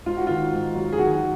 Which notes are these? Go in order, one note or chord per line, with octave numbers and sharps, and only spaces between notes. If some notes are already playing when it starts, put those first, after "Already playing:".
G#2 F4
F#4
D#3 F4
G#2
F#3
G#4
D#3 F#4